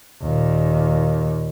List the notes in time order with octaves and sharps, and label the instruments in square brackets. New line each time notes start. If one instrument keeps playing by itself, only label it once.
[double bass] D#2 A#2